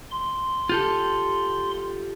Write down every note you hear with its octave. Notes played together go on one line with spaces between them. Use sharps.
C6
F4 G4 A4